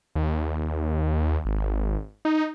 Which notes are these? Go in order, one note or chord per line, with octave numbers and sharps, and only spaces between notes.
D#2
G#1
D#4